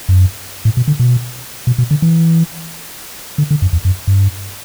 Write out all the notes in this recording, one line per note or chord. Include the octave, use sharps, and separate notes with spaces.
F#2
A2
B2
D3
B2
B2
B2
D3
E3
D3
D3
F#2
E2
F#2
G2